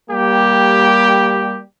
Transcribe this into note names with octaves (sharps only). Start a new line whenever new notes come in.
G3 A#3 G4